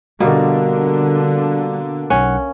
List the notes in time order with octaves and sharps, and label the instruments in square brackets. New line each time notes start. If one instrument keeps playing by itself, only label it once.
[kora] B2 [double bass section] D3 [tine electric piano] G3 D5 [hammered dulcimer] A#3 F#4
[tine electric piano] B1 F#5 [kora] C#4